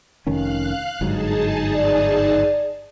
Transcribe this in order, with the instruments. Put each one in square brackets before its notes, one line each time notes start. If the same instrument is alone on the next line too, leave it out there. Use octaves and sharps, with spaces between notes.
[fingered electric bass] F1 D#3 C#4 [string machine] F5 F#6
[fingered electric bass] G1 G#2 F#3 [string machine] D#4 G#4 A5
[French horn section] D5